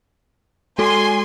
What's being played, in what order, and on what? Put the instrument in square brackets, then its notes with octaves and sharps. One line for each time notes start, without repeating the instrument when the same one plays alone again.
[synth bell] G#3 F#4 A4 [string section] G#5 C6